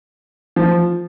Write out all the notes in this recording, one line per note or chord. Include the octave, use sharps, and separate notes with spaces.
F3